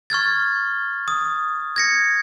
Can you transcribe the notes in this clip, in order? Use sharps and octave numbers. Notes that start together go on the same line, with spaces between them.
C#6 F6 G#6 A6
D#6
G#6 A#6 C#7